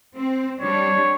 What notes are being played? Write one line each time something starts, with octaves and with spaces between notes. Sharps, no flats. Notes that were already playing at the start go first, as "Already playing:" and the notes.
C4
G3 D4 C#5